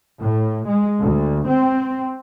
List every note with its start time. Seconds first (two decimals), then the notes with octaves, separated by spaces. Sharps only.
0.21 A2
0.68 G#3
1.01 D2
1.49 C4